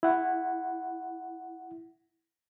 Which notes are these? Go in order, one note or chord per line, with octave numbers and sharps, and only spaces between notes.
E4 F#5